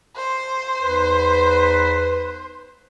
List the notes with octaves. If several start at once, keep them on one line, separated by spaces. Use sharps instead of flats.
C5
E2 D#4 B4